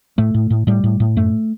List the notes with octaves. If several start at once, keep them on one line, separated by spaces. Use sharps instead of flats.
A2 A3
A2
A2
A2 G3
A2
A2
F#2 A3